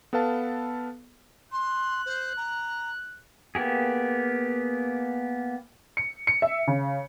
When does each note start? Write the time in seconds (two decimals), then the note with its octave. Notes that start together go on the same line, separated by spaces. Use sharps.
0.13 B3 A4 B4 F5 A5
1.51 C6 F#6
2.05 C5
2.37 A#5
3.55 A#3 B3 G4 G#4
5.97 C#7
6.27 C#7
6.42 E5
6.67 C#3